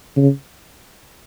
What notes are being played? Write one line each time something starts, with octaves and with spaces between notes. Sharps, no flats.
C#3